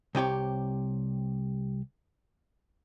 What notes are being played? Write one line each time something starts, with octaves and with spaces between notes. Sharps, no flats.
C2 C3 G4 C#5